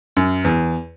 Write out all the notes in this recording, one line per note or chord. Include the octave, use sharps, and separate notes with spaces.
F#2
E2